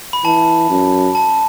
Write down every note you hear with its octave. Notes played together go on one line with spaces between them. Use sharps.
B5
E3 A5
F#2
A5